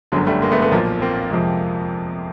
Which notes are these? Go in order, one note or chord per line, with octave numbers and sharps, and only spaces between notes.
G1 F#2 D3 F#3 G#3
G3 A3
G#3 A#3
A3 B3
A3 B3
B1 A#2 F3 A#3
A#3 C4
F2 C3 F3 G#3